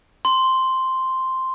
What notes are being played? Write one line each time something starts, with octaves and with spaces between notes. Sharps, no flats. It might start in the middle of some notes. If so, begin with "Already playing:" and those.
C6